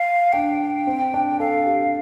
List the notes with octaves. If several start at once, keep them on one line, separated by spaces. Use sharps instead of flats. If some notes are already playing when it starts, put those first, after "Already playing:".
Already playing: F5
D4 G5
C4
D4
A4 F5
G4